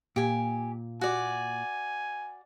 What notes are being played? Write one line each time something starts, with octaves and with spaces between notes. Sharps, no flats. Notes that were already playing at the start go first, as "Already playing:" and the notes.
A#2 G4 G#5
F#4 D5 G#5